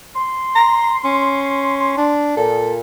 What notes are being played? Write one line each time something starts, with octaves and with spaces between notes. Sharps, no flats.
C6
A#5
C#4
D4
A#2 A4